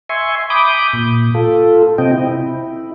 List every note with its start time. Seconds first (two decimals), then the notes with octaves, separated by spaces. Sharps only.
0.09 E5 G#5 C6 C#6
0.50 B5 D6 D#6 G6
0.93 A#2
1.34 F4 A4
1.98 C3 C4 D#5 G5
2.13 E4